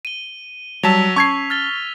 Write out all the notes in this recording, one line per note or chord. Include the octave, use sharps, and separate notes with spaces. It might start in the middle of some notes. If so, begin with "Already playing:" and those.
D#7 G7
F#3 G3 A5 E6 B6 F7
C#4 A5 C#6 G#6 C7
F6 A6 G7